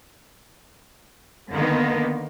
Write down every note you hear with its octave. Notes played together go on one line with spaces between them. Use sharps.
D3 D#3 A#3 B3 D#4